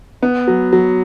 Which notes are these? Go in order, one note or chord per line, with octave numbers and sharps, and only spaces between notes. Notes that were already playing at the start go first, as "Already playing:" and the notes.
B3
F#3
F#3